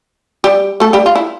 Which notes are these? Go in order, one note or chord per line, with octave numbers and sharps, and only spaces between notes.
G3 G4
A3 A4
G3 G4
F4
E4